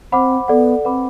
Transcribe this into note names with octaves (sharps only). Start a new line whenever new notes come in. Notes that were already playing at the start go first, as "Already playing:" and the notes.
C4 C5 F#5 B5 D6
B3 A4 D5 F#5
C4 B4 F#5 B5 D6